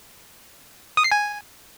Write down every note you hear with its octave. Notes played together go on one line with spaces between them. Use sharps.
D#6
C7
G#5